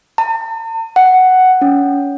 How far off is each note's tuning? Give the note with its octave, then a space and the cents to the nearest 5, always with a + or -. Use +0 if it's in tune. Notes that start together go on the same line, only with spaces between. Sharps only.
A5 +45
F#5 +5
C#4 +25